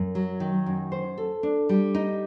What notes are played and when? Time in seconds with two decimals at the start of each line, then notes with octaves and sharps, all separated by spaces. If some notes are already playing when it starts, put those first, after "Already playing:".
Already playing: F#2
0.15 F#3
0.40 D#3
0.66 F#2
0.92 C5
1.18 A4
1.43 D4
1.69 G3
1.95 D#4